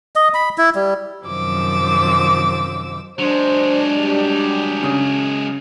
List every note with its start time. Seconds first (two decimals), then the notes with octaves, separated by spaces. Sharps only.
0.16 D#5
0.34 B5
0.58 E4
0.75 G3
1.25 F#2 C3 D#3 F3 D6 E6
3.19 F#3 G#3 D4 C5
3.98 G3 G4
4.83 C#3 D#6